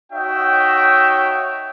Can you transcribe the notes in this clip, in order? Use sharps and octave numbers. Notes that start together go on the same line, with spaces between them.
D#4 F#4 C#5 D#5 E5 G5